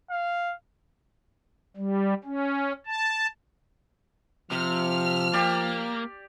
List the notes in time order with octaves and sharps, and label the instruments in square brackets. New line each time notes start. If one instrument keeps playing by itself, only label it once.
[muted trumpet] F5
[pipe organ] G3
C#4
A5
[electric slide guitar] C3 [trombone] F3 [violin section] F6
[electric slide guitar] A#3 [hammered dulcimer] G4 D5